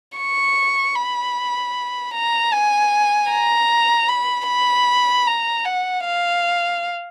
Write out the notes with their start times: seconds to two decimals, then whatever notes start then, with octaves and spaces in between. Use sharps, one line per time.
0.17 C#6
0.96 B5
2.14 A#5
2.53 G#5
3.30 A#5
4.09 B5
4.48 B5
5.27 A#5
5.65 F#5
6.05 F5